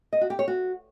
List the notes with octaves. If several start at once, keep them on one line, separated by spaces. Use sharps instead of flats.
D#5
F#4
G4
C#5
F#4